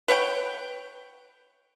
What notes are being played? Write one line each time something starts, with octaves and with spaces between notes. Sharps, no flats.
B4 C#5 F#5 G5